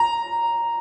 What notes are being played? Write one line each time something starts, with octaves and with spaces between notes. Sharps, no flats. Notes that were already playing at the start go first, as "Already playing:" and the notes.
Already playing: A#5